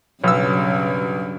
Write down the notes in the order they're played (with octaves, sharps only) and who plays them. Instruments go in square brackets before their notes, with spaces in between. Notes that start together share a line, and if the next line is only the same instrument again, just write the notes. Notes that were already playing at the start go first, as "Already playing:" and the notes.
[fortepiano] B1 E6 [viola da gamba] G2 C#3 F#3